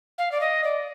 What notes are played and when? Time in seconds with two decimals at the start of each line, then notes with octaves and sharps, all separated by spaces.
0.18 F5
0.31 D5
0.40 D#5
0.64 D5